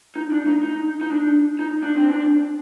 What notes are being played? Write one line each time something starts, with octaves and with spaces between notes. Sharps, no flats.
D#4
D4
D#4
D#4
D#4
D4
D#4
D4
C4
D4